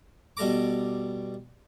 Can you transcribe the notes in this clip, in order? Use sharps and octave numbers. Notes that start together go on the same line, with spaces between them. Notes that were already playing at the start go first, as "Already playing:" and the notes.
B2 G3 A4 A#5 D6